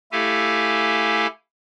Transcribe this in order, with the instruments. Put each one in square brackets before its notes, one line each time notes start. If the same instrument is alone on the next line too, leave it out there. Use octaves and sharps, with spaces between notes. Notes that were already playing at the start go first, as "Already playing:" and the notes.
[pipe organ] A3 E4 G4 A4 F5 G#5